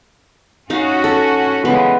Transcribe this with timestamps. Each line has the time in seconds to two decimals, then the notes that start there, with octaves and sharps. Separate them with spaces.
0.70 C#4 D#4 F#4 F5
1.04 A4
1.65 C#3 E3 G#3 B3